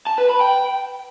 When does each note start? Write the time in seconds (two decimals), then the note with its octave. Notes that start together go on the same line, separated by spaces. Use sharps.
0.07 A5
0.18 B4
0.29 B5
0.41 G5